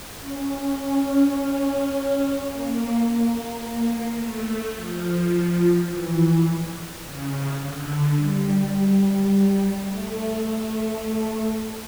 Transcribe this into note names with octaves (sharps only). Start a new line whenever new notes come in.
C#4
C#4
A#3
A#3
A3
F3
E3
C#3
D3
G3
A3
A3